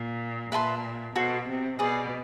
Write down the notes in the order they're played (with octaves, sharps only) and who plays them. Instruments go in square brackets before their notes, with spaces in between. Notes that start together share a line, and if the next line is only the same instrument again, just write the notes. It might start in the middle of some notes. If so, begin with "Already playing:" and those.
Already playing: [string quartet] A#2
[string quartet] A#2 [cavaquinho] B4 E5 A5 C6
[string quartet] B2 [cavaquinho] F#4 A4 C5
[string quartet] C3
[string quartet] B2 [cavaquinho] G#4 B4 D5